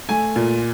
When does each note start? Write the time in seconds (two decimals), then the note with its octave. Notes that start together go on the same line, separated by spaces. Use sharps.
0.09 A3 G#5
0.36 A#2